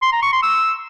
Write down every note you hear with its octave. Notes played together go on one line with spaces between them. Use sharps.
C6
A#5
C#6
C6
E6